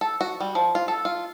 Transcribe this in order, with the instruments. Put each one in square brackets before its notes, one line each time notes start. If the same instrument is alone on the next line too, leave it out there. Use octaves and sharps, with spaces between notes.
[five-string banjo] A4
F#4
G3
F3
F4
A4
F4